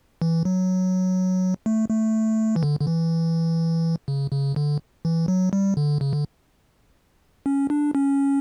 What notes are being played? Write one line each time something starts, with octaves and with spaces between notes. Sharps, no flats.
E3
F#3
A3
A3
E3
D3
D3
E3
C#3
C#3
D3
E3
F#3
G3
D3
C#3
D3
C#4
D4
C#4